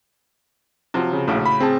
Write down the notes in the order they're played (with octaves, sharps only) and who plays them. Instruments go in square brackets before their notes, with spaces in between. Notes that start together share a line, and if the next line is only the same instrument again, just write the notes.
[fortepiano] C3 F3 F#3
[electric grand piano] C#3
[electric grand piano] A#1 [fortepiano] A2 C#3 F#3
[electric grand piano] B5
C4 G#4 A5